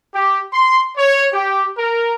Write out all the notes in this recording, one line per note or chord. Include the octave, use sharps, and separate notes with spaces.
G4
C6
C#5
G4
A#4